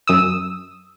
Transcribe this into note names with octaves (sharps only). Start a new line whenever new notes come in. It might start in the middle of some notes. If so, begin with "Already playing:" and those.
F#2 D#6 E6